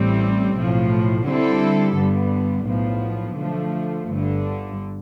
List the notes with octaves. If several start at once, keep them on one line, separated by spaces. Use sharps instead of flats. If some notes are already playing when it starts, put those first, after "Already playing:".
Already playing: A1 A2 G3 C4
B1 A2 F3
D3 G3 C4 E4 A4
G2 D3 G3 B3
B1 A2 F3 B3
D3 F3 A3
G1 G2 D3